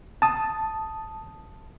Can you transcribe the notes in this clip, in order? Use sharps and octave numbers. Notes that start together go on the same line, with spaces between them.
A5 D#6